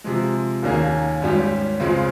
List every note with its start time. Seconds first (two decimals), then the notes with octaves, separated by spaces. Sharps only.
0.04 C3 F3 G#3
0.62 D#2 D#3 A#3 C#4 G#4
1.22 G#1 G#2 G3 C#4 G4
1.80 C#2 C#3 G#3 C4 F4